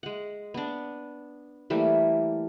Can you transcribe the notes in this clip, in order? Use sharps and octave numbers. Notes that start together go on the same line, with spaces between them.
G#3 F#5
B3 D4
E3 G3 A3 A#3